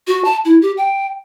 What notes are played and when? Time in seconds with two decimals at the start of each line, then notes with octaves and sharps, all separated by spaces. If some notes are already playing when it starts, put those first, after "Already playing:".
0.07 F#4
0.25 A5
0.45 E4
0.62 G4
0.77 G5